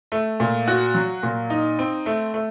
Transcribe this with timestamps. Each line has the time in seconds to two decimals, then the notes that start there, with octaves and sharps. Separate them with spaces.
0.12 A3
0.40 A#2
0.68 F#4
0.94 F#3
1.23 A#2
1.50 D#4
1.79 C4
2.06 A3
2.34 A3